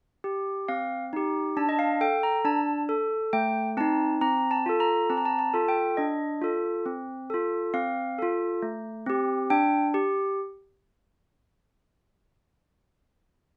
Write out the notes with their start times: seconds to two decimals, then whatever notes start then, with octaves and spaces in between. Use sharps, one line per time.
0.24 G4
0.68 C4 F5
1.13 D#4 G4
1.57 D4 A5
1.69 D#5
1.79 F5
2.01 A4 G5
2.23 A#5
2.45 D4 A5
2.89 A4
3.33 A3 G5
3.77 C4 D#4 A5
4.21 C4 A#5
4.51 A5
4.66 F4 A4
4.80 A#5
5.09 C4 A5
5.17 A#5
5.25 A5
5.39 A5
5.54 F4 A4
5.68 G5
5.97 D4 D#5
6.42 F4 A4
6.86 C4
7.30 F4 A4
7.74 C4 F5
8.18 F4 A4
8.62 A3
9.06 C4 G4
9.50 D4 G5
9.94 G4